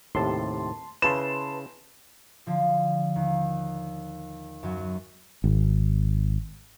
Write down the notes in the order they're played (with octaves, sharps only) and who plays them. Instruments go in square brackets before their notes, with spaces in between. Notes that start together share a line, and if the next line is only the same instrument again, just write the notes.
[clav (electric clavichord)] D#2 A2 C3 [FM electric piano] A5 C6
[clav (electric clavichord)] C#3 E4 [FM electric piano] B4 A5 C6 [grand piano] E7
[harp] D3 F3
D#2
F#2 F#3
[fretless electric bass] G#1